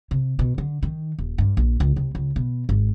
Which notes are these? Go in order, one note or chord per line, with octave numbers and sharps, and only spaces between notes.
C3
B2
D3
D#3
D#1
G2
A#1
C#2
C2
C#2
B2
G#1